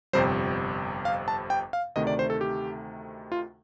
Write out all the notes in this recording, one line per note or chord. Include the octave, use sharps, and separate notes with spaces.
G1 F2 C3 G3 C5
F5
A5
G5
F5
D2 C3 D#3 A3 D#5
D5
C5
A4
G4
F4